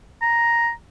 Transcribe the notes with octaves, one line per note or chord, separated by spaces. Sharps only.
A#5